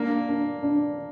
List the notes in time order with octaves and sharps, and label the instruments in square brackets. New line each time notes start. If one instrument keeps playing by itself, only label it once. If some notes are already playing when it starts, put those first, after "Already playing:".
Already playing: [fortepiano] A#3 [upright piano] D4
[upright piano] D4
D4